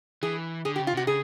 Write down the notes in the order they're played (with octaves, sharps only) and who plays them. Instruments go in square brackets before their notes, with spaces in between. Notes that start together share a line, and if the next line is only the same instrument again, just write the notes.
[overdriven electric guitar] E3 [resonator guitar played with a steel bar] G#4
[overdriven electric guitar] D3 [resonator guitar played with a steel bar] G#4
[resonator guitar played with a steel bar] G4
[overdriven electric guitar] C#3
[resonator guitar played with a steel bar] F4
[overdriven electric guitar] C3 [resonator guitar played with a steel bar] F#4
[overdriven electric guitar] C#3 [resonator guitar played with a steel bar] G#4